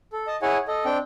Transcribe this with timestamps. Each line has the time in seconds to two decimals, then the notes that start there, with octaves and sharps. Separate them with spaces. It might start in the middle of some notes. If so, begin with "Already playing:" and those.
0.13 A4
0.27 D#5 A5
0.42 E4 G#4 C#5 F#5 G#5
0.68 A4 D#5
0.85 C4 D4 G5